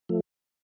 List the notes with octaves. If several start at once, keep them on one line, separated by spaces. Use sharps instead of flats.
F3 A3